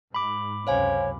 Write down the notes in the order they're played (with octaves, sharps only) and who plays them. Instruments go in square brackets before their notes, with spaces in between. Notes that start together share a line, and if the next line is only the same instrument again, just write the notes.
[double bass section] G#2 [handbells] B5 D6
[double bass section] C#2 F#2 C3 [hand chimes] C5 F5 G#5 [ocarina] C#5